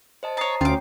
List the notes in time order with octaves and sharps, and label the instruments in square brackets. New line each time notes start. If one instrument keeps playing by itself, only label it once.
[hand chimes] C5 D#5 A5
[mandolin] C#5 A5 [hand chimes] A#5 D#6 C7
[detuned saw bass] D2 [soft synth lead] C#4 [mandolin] F4 D6 [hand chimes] G5